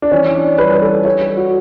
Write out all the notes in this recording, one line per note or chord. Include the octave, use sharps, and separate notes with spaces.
D4
E3 C#4
D4
G3 B4
B4
A4
G3 C#5
F#4